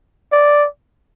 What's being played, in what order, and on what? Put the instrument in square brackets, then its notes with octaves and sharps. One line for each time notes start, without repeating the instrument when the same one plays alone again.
[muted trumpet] D5